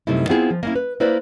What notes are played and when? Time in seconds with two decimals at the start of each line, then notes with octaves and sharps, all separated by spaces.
0.07 F#2 C3 G3 A3 D#4 E4
0.29 B3 C4 E4 F4 G#4
0.50 F3
0.63 A#3 C#4 E4
0.75 B4
1.00 A#3 E4 B4 C5 D5